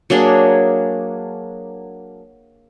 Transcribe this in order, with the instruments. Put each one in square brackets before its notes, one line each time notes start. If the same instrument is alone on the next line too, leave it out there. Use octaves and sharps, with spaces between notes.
[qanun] F#3 A#3 D4 G#4